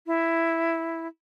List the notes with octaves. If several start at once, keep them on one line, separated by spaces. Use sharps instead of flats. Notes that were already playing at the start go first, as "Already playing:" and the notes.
E4